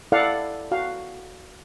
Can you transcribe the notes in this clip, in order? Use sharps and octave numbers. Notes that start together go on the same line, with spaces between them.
E4 A4 D5 F5 F#5
F#4 F5